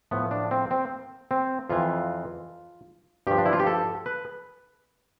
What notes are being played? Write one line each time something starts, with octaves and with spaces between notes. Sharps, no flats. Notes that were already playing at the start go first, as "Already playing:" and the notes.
A2 F3 B3
D4
C4
C4
C4
F2 E3 F4
G2 F3 G4
D4
E4
F4
G4
A4
B4